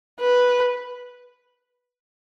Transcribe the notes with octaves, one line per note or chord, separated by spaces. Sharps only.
B4